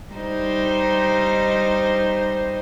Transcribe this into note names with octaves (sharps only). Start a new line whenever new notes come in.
G3 D#4 C5